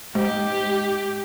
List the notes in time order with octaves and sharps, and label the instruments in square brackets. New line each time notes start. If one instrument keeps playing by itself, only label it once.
[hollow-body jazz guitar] G#2 [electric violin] G4